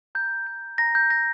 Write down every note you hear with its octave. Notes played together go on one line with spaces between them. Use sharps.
A#5 G6
G6
A#5 A#6
G6
G6 A#6